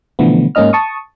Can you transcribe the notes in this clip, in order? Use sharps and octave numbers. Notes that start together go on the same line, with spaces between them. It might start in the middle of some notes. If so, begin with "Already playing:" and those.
B2 D3 E3 F3 A3 B3
G#2 A#3 C#4 D#4 D#5 F6
A5 C#6 D#6